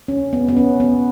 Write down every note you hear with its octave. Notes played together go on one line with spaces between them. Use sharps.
C#4
B3
B3
C#4
B3